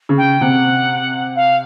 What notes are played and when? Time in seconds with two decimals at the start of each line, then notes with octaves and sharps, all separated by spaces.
0.09 C#3
0.17 G5
0.41 C3 F#5
1.35 F5